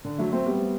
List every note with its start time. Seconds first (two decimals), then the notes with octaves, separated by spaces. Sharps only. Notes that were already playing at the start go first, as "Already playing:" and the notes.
0.05 D3
0.18 F#3 A3
0.32 A3 C4
0.46 G3 B3